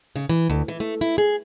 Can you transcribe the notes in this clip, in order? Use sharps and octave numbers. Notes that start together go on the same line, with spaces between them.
C#3
E3
D2
E3
A3
E4
G#4